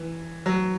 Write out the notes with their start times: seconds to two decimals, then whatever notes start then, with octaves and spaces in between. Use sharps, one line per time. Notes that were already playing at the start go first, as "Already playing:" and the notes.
Already playing: E3
0.46 F#3